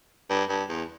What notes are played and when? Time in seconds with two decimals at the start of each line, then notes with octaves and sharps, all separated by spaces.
0.30 G2
0.50 G2
0.69 E2